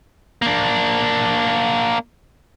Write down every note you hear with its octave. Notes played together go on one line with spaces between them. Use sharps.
A#3 D4